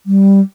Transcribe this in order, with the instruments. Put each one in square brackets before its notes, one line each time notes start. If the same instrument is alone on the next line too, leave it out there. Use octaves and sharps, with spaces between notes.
[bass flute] G3